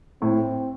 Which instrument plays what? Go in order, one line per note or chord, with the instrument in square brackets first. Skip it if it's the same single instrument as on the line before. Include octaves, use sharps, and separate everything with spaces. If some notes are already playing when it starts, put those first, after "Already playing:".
[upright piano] A2 [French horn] C4